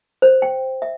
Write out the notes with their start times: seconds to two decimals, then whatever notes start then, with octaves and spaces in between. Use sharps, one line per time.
0.22 C5
0.42 G5
0.82 E5